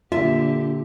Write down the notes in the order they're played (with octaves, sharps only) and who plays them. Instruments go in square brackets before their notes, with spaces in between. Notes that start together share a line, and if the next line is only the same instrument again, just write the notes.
[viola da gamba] A#2 D3 G4 [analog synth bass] F4 [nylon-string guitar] E5